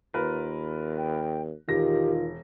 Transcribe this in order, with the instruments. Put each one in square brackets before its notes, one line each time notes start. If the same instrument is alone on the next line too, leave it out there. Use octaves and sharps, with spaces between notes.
[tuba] D#2 [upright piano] F4 A#4 B4
[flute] G5
[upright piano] E1 A#6 [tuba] D#3 [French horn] F4 [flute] G4